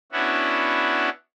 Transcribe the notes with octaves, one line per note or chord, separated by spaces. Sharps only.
B3 C#4 D4 E4 F#4